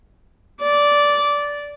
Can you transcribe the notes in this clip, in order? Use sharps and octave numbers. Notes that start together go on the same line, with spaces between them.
D5